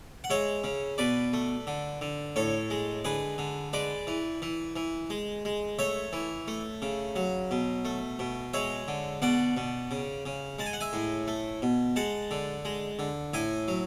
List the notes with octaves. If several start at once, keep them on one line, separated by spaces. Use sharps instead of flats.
F#5
G#3 C#5 E5
C#3
B2 B4 D5
A3
D3
D3
A2 A4 C#5
G#3
D3 G#4 B4
D3
G#3 B4 D5
E3
E3
E3
G#3
G#3
A3 C#5 E5
E3
A3
C#3
F#3
B2
A3
B2
G#3 C#5 E5
D3
B2 D5 F#5
B2
C#3
C#3
G#3 A5
G#5
F#5
E5 G#5
A2
A3
B2
G#3 F#5 A5
D3
G#3
D3
A2 E5 G#5
F#3